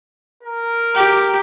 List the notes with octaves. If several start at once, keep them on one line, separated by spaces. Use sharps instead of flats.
A#4
G4